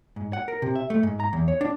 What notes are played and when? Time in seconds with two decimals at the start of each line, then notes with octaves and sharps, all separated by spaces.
0.16 G#2
0.33 F#5
0.48 A#4
0.62 C3
0.75 E5
0.90 A3
1.03 G#2
1.20 A#5
1.33 E2
1.48 C#5
1.61 D4